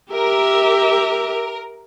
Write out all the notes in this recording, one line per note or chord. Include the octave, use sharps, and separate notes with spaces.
G4 A#4 E5